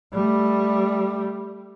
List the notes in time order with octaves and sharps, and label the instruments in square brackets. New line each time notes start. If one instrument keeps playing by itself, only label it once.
[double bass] G3 A3